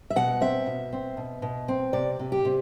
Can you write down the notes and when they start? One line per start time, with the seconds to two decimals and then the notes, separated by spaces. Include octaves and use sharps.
0.10 E5
0.16 B2 F#5
0.41 C4 E5
0.66 B2
0.93 C4
1.17 B2
1.42 B2
1.68 C4
1.93 C3 D5
2.19 C3
2.32 G4
2.45 C3